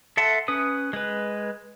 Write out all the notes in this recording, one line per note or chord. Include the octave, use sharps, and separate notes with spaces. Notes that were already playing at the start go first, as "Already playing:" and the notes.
A4 E5 F#5 A5 C6
C#4 B4 D#6
G#3 B4